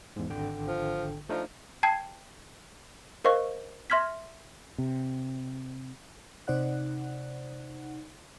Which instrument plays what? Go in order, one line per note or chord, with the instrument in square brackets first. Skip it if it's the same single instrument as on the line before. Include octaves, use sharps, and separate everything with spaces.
[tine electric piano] E2 G#2
G#1 D3 G5
[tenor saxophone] F3
[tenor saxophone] F3 [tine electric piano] A3 D4 D#4
[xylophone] G5 A5 G#6 C7
A#4 C5 D#5 F5 C#6
E5 C6 F6 G#6 B6
[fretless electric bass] C3
[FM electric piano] C3 D#4 C5 D5 F#5 F#6